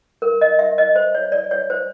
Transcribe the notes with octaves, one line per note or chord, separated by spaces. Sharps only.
A#4
D#5
E5
D#5
C5
C#5
D5
C#5
C5